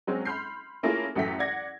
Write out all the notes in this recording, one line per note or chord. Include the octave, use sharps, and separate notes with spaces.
F#3 G#3 C4 C#4
B5 C6 F6 G6 C7
A3 A#3 C#4 E4 F4 G#4
A1 F#2 F#3 A3 G5 B6
D5 F#5 G#6 A#6